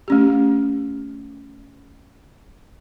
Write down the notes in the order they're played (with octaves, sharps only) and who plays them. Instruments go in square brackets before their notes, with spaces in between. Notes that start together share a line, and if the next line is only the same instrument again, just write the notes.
[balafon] A3 C#4 G4